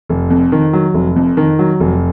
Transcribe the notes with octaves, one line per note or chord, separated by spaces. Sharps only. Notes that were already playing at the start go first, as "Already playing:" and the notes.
F1
F2
D#3
F#3
F1
F2
D#3
F#3
F1